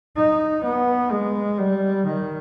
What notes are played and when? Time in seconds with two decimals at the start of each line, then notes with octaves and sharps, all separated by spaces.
0.16 D#4
0.64 B3
1.11 G#3
1.58 G3
2.06 D#3